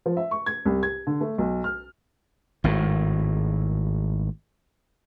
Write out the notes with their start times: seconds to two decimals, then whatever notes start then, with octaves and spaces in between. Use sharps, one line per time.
0.06 F3
0.17 E5
0.31 C#6
0.46 G#6
0.66 C2
0.83 G#6
1.07 D3
1.21 A3
1.38 B1
1.64 F6
2.64 G#1 A2